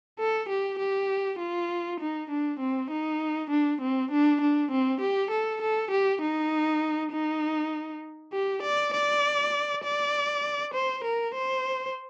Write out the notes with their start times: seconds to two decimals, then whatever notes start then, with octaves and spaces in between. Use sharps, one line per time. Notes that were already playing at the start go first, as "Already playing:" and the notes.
0.19 A4
0.49 G4
0.79 G4
1.39 F4
2.00 D#4
2.30 D4
2.59 C4
2.90 D#4
3.50 D4
3.81 C4
4.11 D4
4.41 D4
4.71 C4
5.01 G4
5.31 A4
5.62 A4
5.91 G4
6.22 D#4
7.12 D#4
8.33 G4
8.62 D5
8.93 D5
9.84 D5
10.74 C5
11.04 A#4
11.34 C5